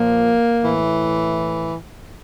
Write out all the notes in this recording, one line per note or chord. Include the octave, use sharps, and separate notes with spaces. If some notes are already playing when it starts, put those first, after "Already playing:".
Already playing: A#2 F3 A#3
A2 E3